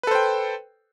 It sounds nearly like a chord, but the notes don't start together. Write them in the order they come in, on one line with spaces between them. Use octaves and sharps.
B4 A4 C5 G5